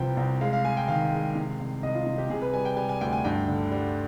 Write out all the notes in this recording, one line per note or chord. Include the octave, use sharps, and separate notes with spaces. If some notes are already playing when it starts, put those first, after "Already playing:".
Already playing: C2 C3 F3 B4 C5 G5
C2
G#3 F5
F5
G#3 G#5
G5
D#3 F5
G#3
C3
C2
C2 D#5
F4
C3 F4
G4
C3 G#4
B4
G3 G#5
G5
G3 G#5
G#5
D2 G5
G#5
G2 G5
D3
G3